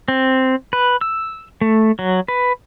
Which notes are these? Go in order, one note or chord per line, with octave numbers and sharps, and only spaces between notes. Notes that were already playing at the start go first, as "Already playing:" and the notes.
C4
B4
E6
A3
F#3
B4